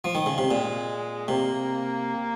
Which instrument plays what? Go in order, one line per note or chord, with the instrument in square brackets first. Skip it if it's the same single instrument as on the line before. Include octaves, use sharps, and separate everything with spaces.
[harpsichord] F3
D#3
C#3
C3
[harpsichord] A#2 [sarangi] G#3
[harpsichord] C3 [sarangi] A#3